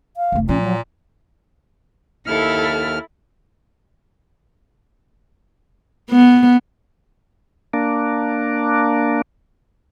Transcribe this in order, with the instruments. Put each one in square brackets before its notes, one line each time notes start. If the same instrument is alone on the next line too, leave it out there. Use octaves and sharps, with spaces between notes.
[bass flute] F5
[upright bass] F1 A3
[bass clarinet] A#2 [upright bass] F3 [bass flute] C#4
[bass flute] F#3
[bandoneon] D#2 F6 [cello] E4 A4
[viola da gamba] B3
[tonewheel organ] A#3 D4